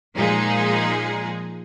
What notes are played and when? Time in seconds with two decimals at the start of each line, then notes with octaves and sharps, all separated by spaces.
0.14 A#2 F3 G#3 D#4 G#4